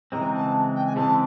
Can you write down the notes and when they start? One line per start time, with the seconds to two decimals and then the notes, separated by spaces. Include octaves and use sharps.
0.12 C#3 E3 G#3 C4 A#5
0.33 A5
0.75 G5
0.86 G#5
0.96 C#3 E3 G#3 C4 A5